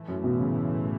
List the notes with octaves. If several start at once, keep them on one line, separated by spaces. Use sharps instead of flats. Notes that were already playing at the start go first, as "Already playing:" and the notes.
Already playing: A2 E3 A3
F#2
B1 B2
C#3